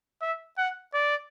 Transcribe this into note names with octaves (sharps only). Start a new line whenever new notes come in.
E5
F#5
D5